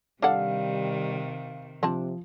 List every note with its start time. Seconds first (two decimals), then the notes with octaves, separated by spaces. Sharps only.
0.22 C3 D#3 G3 D4 A4 F5 F#5
1.83 C3 F3 C4 D4 A5